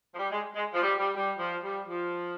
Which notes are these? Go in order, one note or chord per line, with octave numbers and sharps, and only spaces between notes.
F3
G3
G#3
G#3
F3
G3
G3
G3
F3
G3
F3